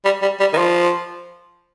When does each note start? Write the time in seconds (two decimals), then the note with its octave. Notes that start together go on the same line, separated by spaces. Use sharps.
0.05 G3
0.22 G3
0.40 G3
0.53 D#3
0.58 F3